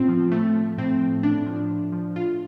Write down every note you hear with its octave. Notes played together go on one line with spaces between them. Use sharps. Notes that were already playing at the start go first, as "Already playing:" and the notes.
Already playing: A2 C4 F4
F3
A2 A3
F3
A2 C4
F3
A2 D4
F3
A2
F3
A2 F4